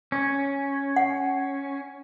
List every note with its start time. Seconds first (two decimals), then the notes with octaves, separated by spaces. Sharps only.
0.12 C#4
0.96 F#5